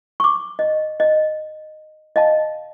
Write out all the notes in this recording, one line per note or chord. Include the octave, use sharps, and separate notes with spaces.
C#6 D6
D#5
D#5
D#5 F5 A5